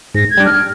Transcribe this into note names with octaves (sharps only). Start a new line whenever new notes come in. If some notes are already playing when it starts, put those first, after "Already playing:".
G#2 A#6
G#6
G3 D4
F6